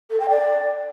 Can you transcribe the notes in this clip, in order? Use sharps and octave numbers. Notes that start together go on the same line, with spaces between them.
A4
G5
D5